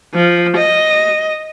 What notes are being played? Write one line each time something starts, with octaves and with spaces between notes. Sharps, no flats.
F3
D#5